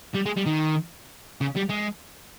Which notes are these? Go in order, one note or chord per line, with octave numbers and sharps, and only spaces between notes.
G3
G#3
G3
D#3
C#3
G3
G#3